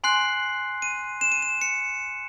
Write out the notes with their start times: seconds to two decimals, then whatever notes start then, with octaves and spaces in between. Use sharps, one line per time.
0.04 G#5 C6 F#6 C7
0.82 D#7
1.21 E7
1.32 D#7
1.42 E7
1.61 C#7